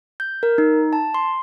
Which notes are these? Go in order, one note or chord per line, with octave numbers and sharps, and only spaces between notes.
G6
A#4
D#4
A5
C6